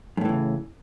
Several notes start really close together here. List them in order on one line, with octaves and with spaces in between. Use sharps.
F#2 A2 E3 C#3